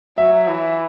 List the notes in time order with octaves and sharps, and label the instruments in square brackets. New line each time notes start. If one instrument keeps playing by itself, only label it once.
[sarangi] F#3 [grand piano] E5
[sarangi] E3